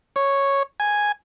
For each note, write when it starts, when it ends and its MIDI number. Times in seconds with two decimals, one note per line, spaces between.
0.16 0.63 73
0.80 1.12 80